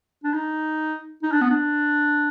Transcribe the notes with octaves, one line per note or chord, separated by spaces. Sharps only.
D4
D#4
D#4
D4
B3
D4